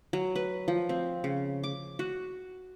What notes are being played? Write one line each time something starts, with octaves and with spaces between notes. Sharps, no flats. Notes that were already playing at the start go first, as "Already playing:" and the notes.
F#3
B4
F3
C4
C#3
D6
F#4